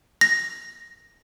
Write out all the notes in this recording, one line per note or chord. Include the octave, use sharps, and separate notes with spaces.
A#6